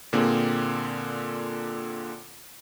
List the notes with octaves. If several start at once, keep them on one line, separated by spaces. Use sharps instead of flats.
A#2 D3 A#3 C4 G#4